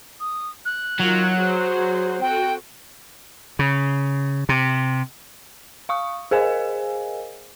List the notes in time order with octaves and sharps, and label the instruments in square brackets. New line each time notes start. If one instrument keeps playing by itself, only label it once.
[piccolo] D#6
F#6
[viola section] D#3 F4 [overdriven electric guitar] F#3
[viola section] F#4 G#4 C5
[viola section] C4 F#4 A4 [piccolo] G5
[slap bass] C#3
C3
[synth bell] F5 C#6 D#6
G#4 A#4 C5 D#5 F5 G#5